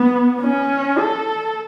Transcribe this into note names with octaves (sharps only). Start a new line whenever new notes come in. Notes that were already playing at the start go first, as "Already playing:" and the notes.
Already playing: B3
C#4
A4